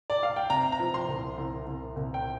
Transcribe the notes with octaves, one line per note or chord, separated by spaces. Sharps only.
D5
F5
G5
C3 A#5
A#5
F3
C6
C2
C2
C2
C2
G5